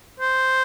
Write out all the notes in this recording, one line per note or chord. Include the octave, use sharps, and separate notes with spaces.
C5